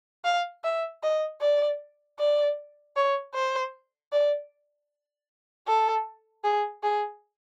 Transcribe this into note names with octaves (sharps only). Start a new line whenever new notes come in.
F5
E5
D#5
D5
D5
C#5
C5
D5
A4
G#4
G#4